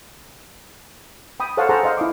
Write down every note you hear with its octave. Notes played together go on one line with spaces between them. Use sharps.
G5 B5 D#6
A4 C5 C#5 F5 F#5 A5
G#4 A4 C5 F#5 A5 A#5
C5 D#5 F5
E4 F5 D6